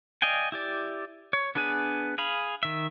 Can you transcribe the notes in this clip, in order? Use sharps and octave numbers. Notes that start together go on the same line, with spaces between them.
D5 D#5 F5 G5 G#5
E4 G4 D5
C#5
B3 D4 G#4 B4 G#5
G#4 F5 B5
D#3 E5